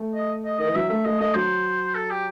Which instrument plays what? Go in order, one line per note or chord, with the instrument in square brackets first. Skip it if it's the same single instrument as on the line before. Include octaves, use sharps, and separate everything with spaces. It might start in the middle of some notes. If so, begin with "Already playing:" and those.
Already playing: [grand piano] A3
[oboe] D#5
D#5
[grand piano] D#3 [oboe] D#5
[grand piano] E3
[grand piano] F#3 [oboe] E5
[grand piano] A3 [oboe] E5
[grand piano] A3 [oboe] D#5
[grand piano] A3 [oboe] D#5
[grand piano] F#3 [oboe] C5
[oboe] A4
G4